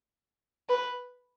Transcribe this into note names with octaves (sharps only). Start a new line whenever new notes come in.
B4